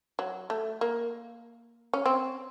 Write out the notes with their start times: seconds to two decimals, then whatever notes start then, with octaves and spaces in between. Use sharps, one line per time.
0.19 F#3
0.50 A3
0.81 A#3
1.94 C#4
2.06 C4